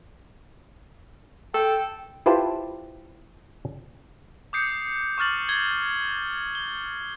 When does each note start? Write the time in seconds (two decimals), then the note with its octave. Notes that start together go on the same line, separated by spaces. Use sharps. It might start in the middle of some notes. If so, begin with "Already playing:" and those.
1.54 A4 G5
2.26 E4 F4 G4 B4 C5 A5
4.53 D6 D#6 G6 C7 C#7
5.18 C#6 D6 F6 A6 F#7
5.49 G#6 G7
6.55 G7